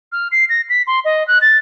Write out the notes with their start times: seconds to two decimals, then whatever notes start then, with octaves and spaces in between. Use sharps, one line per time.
0.12 F6
0.32 C7
0.49 A#6
0.69 B6
0.87 C6
1.05 D#5
1.27 F#6
1.41 A6